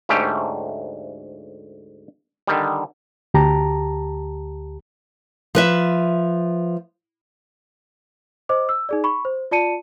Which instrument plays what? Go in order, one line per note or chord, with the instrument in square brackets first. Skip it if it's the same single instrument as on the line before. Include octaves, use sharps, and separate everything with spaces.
[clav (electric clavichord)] D2 G#2 A3 C#4 G4
D3 D#3 G3
[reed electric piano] D2 G4 A5 A#5
[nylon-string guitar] F3 B4 E5
[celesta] C5 D#5 D6
E6
D#4 G#4 D5
B5 C#6
C5
F4 D5 A5 C#7 D#7